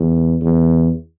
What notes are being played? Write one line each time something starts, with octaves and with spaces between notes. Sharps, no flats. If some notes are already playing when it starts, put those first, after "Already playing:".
Already playing: E2
E2